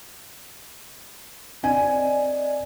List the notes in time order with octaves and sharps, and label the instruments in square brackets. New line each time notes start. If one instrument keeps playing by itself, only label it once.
[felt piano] C4 G#5 [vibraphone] D5 D#5